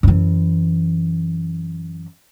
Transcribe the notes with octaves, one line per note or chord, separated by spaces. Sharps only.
F#2 E3